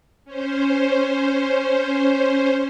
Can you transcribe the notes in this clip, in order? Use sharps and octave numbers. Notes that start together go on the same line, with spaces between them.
C#4 C5